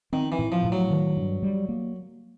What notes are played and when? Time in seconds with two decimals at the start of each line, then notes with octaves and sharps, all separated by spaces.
0.13 D#3 C4
0.32 E3
0.39 A2
0.52 F3
0.64 A2
0.72 F#3
0.91 D#3
1.17 G2
1.43 G3
1.69 A#3